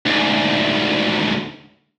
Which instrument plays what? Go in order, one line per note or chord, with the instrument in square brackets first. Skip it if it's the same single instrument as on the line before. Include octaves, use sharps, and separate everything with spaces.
[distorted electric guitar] D2 G#2